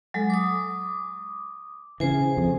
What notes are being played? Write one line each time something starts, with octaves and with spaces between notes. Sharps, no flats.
F#3 G#3 A4
D6 D#6
C#3 E3 G#4 C5 G#5
F2